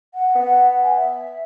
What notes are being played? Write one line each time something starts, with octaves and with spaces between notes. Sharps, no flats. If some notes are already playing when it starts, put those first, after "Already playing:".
F#5
B3
G#5
E5